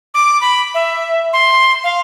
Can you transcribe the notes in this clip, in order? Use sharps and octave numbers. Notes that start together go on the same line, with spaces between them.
D6
B5
E5
C6
F5